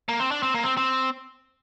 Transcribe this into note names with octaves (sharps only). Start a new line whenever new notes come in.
A#3
C4
D4
C4
A#3
C4
C4